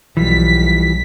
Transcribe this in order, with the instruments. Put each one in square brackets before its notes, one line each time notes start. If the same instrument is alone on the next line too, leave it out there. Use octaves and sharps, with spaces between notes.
[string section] B1 B6 [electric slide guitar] E3 F3 G3